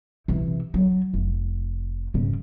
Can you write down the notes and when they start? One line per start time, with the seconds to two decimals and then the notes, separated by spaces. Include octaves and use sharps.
0.28 C3 E3
0.74 F#3
1.14 F1
2.14 G#2 C#3